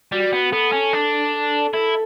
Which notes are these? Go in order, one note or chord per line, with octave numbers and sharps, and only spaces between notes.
G3 F#4
B3
B3 A4
C#4
D4
E4 A4